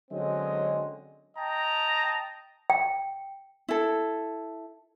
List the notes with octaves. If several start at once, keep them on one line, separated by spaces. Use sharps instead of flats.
D3 F#3 G#3 C4 C#4 D#5
D#5 G5 A5 A#5
G5
E4 A4